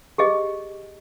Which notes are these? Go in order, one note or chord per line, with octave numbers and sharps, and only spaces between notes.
G4 G#4 D#5